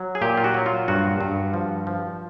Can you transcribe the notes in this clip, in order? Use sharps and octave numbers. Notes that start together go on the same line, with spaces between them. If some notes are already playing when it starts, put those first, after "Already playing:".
Already playing: F#3
G#4
A#2 G4
F4
F#4
F#3
F4
G2 F#4
G2
F3
F3